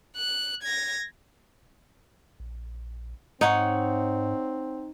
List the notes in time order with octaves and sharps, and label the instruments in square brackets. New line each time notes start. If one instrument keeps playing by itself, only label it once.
[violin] F#6
G#6 A#6
[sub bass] A#1
[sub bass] G#2 [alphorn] C4 [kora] D#4 [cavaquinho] C#5 F#5 G#5